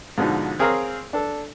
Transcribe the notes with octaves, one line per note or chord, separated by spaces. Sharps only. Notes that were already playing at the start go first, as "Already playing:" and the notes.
G#2 B2 D3 F3 D#4
C4 G#4 A#4 C#5 F5 A#5
D4 A4